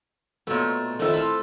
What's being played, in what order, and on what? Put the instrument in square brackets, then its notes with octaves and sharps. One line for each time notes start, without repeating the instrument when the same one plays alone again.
[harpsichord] B1 C#5 [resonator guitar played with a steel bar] A#2 A3
[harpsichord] F2 A#2 D#3 [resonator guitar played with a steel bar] A3 E5 [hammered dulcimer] E4 A#4
[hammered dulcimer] C4 [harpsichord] F4 A4 B5